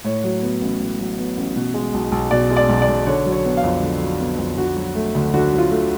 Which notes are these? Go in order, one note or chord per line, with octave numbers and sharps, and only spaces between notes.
A2 C#5
F#3
B3
A1
A2
F#3
B3
A1
B2
G#3
B1
B1
B2 D5
G#3
D5
B1
D5
B1
D3 C#5
F#3
C#5
B3
F5
F2
D3
F#3
B3
F2
D3 F#4
F#3
A3
D2
D3 F#4
F#3
F4
A3